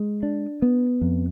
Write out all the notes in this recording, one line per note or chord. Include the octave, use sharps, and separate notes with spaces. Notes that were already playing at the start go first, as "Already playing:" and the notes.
Already playing: G#3
D4
B3
F2